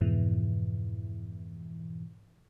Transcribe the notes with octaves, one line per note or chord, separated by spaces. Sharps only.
F2 G#2 B2 E3